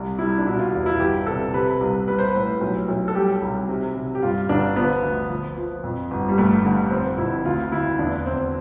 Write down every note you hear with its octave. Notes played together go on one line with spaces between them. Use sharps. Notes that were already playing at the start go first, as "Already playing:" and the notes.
Already playing: C2
G3 E4
D4
B2 E4
F4
E2
E4
G1 G4
C3 A4
C3 B4
C2
G3 B4
C5
A2 B4
B1
B1
A4
G3 G4
C2
C3
C3
G4
G2 F4
G1 D4
F3 B3
D2
F3
F3
F2
G1
G3
G2 A3
D3
F1 C4
F2 E4
D2 F4
D2 E4
E2 D4
E2 C4